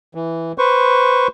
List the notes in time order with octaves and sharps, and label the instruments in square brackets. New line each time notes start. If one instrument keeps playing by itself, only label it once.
[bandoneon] E3
B4 C5 C#6